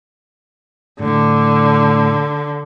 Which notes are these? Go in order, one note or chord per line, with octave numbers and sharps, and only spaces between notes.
A2 D3